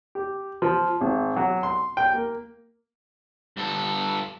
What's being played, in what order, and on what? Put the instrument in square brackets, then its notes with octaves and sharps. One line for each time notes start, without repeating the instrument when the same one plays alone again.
[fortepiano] G4
F3
G#1
F#3
C6
G5
A#3
[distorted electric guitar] G2 A4